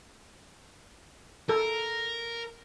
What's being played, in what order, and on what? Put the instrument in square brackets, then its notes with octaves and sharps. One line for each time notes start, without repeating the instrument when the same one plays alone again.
[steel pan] A4 [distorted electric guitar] A#4